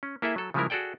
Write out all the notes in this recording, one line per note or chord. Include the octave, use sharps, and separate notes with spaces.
C#4
A#3 E4 G#4 A4 E5
F#3 A4
C#3 F3 G3 G#3 E4 A#4
F#4 G#4 A4 D5 G5